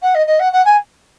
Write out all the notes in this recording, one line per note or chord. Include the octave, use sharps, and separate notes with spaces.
F#5
D#5
D#5
F#5
F#5
G#5